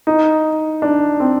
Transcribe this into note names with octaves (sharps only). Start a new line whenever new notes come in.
D#4
D4
C4